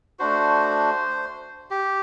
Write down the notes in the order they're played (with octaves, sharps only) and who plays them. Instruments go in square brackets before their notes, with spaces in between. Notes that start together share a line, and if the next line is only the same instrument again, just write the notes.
[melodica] A3 D4 F#4 C5
G4